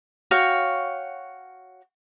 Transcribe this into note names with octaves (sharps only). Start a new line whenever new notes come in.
F#4 C#5 F5 G5